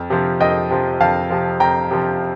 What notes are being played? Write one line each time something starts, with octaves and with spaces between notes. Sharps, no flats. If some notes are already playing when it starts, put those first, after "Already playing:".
Already playing: F2
C3 F3
F2 D#5 G5
C3 F3
F2 F5 A5
C3 F3
F2 G5 A#5
C3 F3